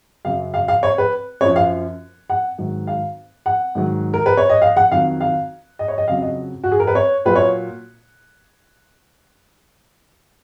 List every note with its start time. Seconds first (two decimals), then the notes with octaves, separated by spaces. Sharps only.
0.25 F#2 C#3 F#3 F5
0.54 F5
0.68 F5
0.83 C#5
0.98 B4
1.41 F#2 F3 C#5
1.56 F5
2.30 F#5
2.58 G#2 D#3 F#3
2.87 F5
3.46 F#5
3.75 G#2 D#3 F#3
4.14 A#4
4.26 B4
4.37 C#5
4.50 D#5
4.62 F5
4.77 F#5
4.91 F2 D#3 F#3 F5
5.21 F5
5.79 D#5
5.88 C#5
5.98 D#5
6.08 F2 C#3 F#3 F5
6.22 D#5
6.64 F#4
6.72 G#4
6.80 A#4
6.87 B4
6.95 C#5
7.25 A#2 F#3 B4
7.36 C#5